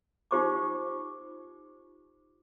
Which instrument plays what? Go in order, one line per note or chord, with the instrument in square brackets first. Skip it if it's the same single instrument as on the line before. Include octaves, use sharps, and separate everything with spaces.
[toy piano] D#4 F4 G4 C5 C#6 D6